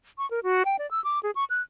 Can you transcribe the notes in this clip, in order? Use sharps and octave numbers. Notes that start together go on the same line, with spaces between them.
C#6
A#4
F#4
G5
D5
E6
D6
G#4
C#6
F#6